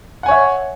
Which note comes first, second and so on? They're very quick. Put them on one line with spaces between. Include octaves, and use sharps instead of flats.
F#5 G#5 C#5 E5